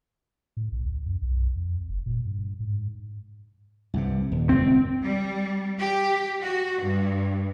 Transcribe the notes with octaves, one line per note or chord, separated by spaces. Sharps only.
A2
A#1
D2
F#2
B1
F2
F#1
A#2
G2
G#2
C2 G2 C3
D#1
D#1 C#2 C3 C4
G3
G4
F#4
G2